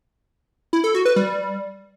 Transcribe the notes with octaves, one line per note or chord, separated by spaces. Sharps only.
E4
A4
F#4
B4
G3